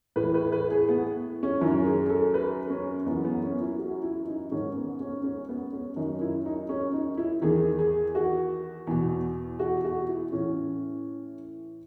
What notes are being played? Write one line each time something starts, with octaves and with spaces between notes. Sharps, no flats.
A2 E3 B4
B4
B4
G#4
B3
C#4
F#2 D#3 E4
G#4
A4
B4
C#4
F#2 E3 B3
B3
C#4
E4
F#4
E4
D#4
G#2 D#3 C#4
B3
C#4
C#4
B3
C#4
F#2 D#3 D#4
E4
D#4
C#4
D#4
E4
E2 D#3 G#4
G#4
F#4
E2 B2
F#4
F#4
E4
A2 E3 C#4